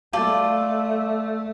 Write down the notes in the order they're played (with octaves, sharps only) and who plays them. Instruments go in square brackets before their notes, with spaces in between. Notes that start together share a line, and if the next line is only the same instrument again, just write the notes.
[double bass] A3 [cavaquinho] F4 A4 D5